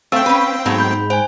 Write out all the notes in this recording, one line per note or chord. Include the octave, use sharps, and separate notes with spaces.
A3 C4 F5 G5 E6
C#4 B4
G#2 F#3 A3 B3
B5 G6
C5 G5 G#5